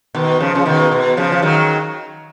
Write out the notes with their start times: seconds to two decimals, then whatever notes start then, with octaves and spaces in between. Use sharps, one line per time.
0.14 B2 D#3
0.40 C#3 F3
0.55 C#3
0.65 B2 D#3
0.91 B2
1.17 C#3 F3
1.32 F3
1.42 D#3 F#3